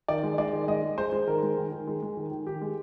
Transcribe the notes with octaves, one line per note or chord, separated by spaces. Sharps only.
D#3 D5
G#3
G#3 D5
D#3
G#3 D#5
G#3
G#3 C5
G#3
D#3 A#4
G#3
D#3
D#3
G#3
G#3
D#3
D#3
D#3 G4
G#3